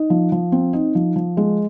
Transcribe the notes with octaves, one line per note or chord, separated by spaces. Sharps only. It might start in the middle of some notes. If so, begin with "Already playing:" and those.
Already playing: D#4
F3
F3
C4
D#4
F3
F3
G#3